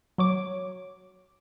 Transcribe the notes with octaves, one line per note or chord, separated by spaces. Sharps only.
F#3 C#5 D6